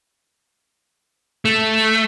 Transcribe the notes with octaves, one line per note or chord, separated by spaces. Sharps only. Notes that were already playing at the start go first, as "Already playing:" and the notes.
A3